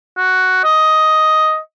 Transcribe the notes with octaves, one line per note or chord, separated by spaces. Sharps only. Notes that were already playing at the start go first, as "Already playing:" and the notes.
F#4
D#5